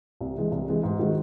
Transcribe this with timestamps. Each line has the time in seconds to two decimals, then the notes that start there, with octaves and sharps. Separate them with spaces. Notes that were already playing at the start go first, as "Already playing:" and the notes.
0.21 C2
0.36 C3 E3 G#3
0.52 C2
0.68 C3 E3 G#3
0.83 G#2
0.99 D#3 G#3 D#4 F#4